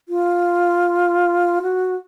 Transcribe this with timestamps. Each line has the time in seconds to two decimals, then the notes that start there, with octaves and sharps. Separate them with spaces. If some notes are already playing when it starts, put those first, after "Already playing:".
0.09 F4
1.63 F#4